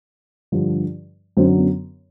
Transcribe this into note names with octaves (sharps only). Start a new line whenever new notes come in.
G2 D3 F3
F#2 D3 F#3 C4
B3